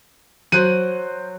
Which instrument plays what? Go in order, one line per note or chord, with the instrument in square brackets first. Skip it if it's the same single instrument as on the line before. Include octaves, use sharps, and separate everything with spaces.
[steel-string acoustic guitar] F#3 [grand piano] C5 F#6 D#7